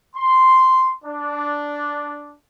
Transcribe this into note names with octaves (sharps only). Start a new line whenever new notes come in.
C6
D4